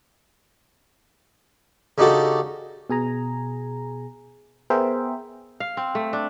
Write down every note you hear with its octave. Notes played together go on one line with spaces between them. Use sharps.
C#3 D4 D#4 F#4 G4 A4
B2 G#4 G#5 A#5
B3 G#4 A#4 C5 E5 G5
F5
C4
A3
D4